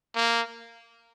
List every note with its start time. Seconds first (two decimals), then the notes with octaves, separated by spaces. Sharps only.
0.16 A#3